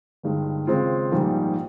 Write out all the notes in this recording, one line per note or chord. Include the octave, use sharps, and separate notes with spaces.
G1 G2 D#3 G#3
D#2 C#3 G#3 C4 F4
A#1 G#2 D#3 G3 A#3